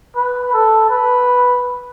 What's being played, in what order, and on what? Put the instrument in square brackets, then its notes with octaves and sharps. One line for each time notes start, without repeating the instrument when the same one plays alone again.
[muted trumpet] B4
A4
B4